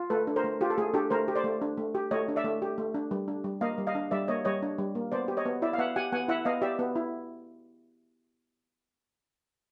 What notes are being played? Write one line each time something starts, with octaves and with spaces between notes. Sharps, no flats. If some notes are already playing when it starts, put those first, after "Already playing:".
Already playing: F4
A3 A4 B4
D4
A#4 C5
A3
F4 G4
A4
A3 G#4
D4 G4 A4
A3 A#4 C5
G4
C5 D5
A3
D4
A3
G4
A3 C#5 D#5
D4
D5 E5
A3
G4
A3
D4
G3
D4
G3
A#3 D#5 F5
G3
D#5 F5
D4
G3 D5 E5
A#3 C#5 D#5
G3 C#5 D#5
D4
G3
A#3
B3 C5 D5
G4
C#5 D#5
B3
E4 D5 E5
F5
B3 E5 F#5
G4 F#5 G#5
B3 F#5 G#5
E4 E5 F#5
B3 D#5 F5
G4 D5 E5
B3
E4